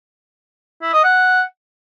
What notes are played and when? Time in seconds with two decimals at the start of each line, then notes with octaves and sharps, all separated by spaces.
0.82 E4
0.93 D#5
1.04 F#5